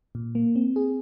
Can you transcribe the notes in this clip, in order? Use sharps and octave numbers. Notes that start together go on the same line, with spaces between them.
A#2
A#3
C4
G#4